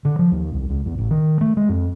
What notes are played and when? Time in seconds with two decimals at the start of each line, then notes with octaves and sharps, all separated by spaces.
0.05 D3
0.19 F3
0.32 D#2
0.52 C2
0.69 C#2
0.86 E2
0.98 A1
1.11 D#3
1.41 A3
1.57 G#3
1.69 F2